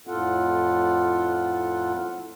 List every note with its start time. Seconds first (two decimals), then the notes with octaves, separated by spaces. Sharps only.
0.07 F2 A2 F4 A4 F#5